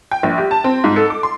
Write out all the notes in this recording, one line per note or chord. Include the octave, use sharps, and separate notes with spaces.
G5
A#1
G4
A5
C4
G#2
A4
D6
C6